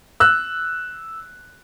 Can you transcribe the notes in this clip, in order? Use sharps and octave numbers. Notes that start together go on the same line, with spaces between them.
E6 F#6